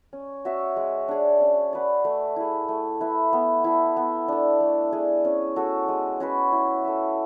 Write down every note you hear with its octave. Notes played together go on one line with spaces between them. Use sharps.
C#4
F#4 C#5 E5
G#3
D4 G#4 C#5
C#4
F#4 B4 D5
A3
E4 G#4
A3
E4 B4 E5
B3
E4 A4
B3
D4 A4
A3
D4 G#4
C#4
F#4 A4
G#3
C#4 F#4 B4
E4
A4 E5